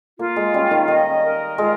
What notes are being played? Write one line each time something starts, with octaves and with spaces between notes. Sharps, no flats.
A#3 F4
G#3
G3 C#4
D#3
D#3 D#5
A#4
G#3 F4